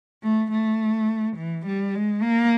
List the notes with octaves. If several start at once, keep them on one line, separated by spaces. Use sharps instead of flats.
A3
A3
E3
G3
G#3
A#3